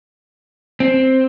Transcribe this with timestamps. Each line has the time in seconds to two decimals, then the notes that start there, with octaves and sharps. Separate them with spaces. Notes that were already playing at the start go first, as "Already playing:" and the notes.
0.80 C4